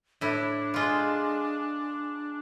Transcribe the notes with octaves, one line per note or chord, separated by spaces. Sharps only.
A2 D4 E4
G#3 F4